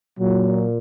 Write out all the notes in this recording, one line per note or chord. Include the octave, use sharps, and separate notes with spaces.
A#2 F#3